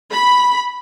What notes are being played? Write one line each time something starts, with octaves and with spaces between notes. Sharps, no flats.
B5